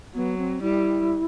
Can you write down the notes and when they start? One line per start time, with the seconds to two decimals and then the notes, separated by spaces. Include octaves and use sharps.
0.15 F#3 B3
0.38 C4
0.62 G3 E4